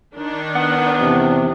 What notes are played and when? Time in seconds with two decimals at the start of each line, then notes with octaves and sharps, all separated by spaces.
0.15 D#3 D4
0.55 B3 F#5
1.00 E2 C3